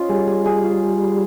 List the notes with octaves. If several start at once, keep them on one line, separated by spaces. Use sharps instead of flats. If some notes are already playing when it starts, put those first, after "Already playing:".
Already playing: C#4 F4 D#5
G3 G#4
G#4
G#4
F4